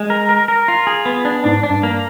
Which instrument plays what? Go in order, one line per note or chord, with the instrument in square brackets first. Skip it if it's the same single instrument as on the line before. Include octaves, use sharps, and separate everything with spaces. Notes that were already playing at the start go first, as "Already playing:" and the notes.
Already playing: [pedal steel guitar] G#3
A#4
A#4
A#4
F4
G#4
B3
D4
[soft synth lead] G#2 [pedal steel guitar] D4
[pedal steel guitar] D4
[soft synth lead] G2
[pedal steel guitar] A#3